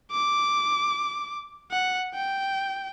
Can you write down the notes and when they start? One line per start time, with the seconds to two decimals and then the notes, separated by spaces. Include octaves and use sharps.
0.12 D6
1.71 F#5
2.14 G5